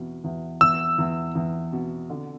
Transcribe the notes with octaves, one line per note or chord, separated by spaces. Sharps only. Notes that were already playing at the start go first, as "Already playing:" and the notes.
Already playing: E2 B2
E2
E2 E6
E2
E2
B2
D3